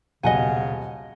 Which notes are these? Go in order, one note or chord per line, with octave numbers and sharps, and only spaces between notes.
D#1 B1 C#3 D#5 F#5 G#5